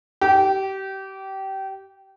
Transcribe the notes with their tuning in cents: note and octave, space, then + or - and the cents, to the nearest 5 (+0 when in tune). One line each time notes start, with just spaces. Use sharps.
G4 -25